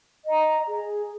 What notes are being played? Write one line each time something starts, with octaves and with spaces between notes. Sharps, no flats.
D#5 A#5
G#4